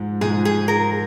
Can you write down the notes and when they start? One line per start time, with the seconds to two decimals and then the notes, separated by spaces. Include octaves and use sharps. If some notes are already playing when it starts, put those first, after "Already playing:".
Already playing: G#2 F3 G#3
0.21 G#2 F3 G#3 G#4
0.45 G#4
0.68 A#4